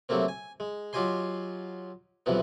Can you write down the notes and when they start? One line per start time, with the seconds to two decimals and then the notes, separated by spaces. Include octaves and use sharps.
0.09 C3 F#3 A3 A#3 C4
0.28 G#5
0.60 G#3
0.93 F#3 F4 G4 D#5 G#5 C6
2.26 B1 G2 C3 E3 F3 B3